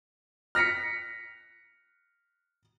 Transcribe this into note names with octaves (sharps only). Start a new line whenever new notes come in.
F6 A#6 B6 C#7